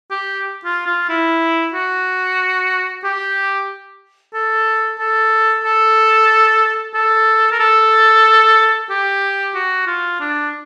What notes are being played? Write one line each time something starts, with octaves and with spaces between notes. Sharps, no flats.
G4
F4
F4
E4
F#4
G4
A4
A4
A4
A4
A#4
A4
G4
F#4
F4
D4